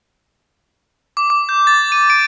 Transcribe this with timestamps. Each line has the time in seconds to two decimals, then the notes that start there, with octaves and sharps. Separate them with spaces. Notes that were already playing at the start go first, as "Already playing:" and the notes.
1.17 D6
1.30 D6
1.49 G6
1.67 A6
1.92 D#7
2.10 D7